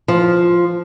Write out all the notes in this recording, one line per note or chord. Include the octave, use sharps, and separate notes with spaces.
F3